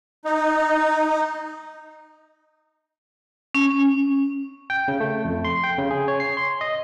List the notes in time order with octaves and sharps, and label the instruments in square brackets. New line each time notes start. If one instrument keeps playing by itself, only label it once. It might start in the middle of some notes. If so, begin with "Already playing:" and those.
[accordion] D#4
[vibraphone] C#4
[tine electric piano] G5
C#3
A3
F2
C6
G5
C#3
G#4
C#5
C7
C6
D#5